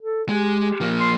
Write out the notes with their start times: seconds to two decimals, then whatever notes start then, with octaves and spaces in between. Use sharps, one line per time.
0.01 A4
0.29 G#3 G4
0.81 F3 A#3
1.00 C6